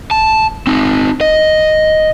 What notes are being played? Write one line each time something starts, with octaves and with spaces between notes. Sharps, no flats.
A5
C4 D#4
D#5